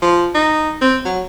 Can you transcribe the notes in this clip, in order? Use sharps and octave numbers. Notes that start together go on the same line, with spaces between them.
F3
D#4
C4
F#3